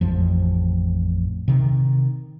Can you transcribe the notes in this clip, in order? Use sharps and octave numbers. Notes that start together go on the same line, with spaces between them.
A1 F2 F3
C3 D#3